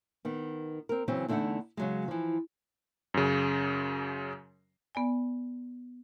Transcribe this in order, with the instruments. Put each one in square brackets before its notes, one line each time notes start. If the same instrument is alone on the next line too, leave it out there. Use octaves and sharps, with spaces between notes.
[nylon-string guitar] D#3 B3
C4 A#4
C#3 E3 F#3 C4 C#4
E2 D3 A3 D#4 E4 F#5
C#3 F#3 G#3
E3 F3
[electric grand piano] F#2 C#3
[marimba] B3 D5 G#5